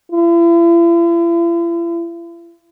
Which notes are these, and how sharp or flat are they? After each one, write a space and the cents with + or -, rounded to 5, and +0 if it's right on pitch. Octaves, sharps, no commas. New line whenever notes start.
E4 +45